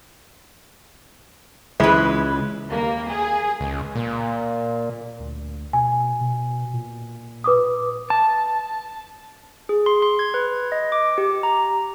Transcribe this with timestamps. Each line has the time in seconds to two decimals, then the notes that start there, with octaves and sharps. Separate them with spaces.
1.80 C#2 E3 G#3 E4 B4
2.68 D#2 G3 A#3
3.09 G#4
3.60 C#2
3.95 A#2
5.20 D2
5.73 B2 G#5
6.21 B2
6.73 A#2
7.44 B4 D6 D#6
8.10 A5
9.69 G#4
9.86 C6
10.02 C6
10.19 G#6
10.34 B4
10.72 D#5
10.92 D6
11.18 G4
11.43 A#5